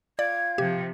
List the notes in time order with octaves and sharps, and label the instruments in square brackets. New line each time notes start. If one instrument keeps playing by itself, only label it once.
[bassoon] F4 [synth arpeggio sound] D5 [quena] G#6
[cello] C3 F3 [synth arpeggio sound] G4